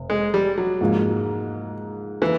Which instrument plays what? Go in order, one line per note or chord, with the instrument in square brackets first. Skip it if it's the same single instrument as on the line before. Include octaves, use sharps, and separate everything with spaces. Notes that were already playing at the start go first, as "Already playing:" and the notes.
Already playing: [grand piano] F1
[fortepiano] G#3
G3
F#3
[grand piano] G#2 F3 A#3
[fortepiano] E3 [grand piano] A#3